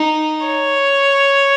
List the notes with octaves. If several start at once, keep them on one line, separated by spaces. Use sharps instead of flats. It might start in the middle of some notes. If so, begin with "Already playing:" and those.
Already playing: D#4
C#5